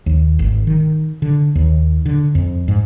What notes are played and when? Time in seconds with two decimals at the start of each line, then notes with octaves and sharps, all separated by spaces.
0.06 D#2
0.39 G#1
0.67 D#3
1.22 D3
1.55 D#2
2.06 D3
2.35 F2
2.68 G#2